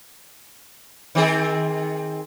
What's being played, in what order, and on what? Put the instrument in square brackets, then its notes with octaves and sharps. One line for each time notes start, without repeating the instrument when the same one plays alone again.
[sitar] D#3 C4 G#4